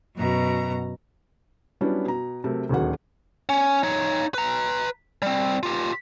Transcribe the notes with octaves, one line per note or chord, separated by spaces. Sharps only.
F#2 B2 A#5
F#3 G3 B3 C#4 D4 E4
B2 A#5
C3 F#3 A3 A#4
D#1 D2 D#3 F#3 G#4 F#5
C#4
D#4 C#5
B4 A#5
G3 C4
F4 G4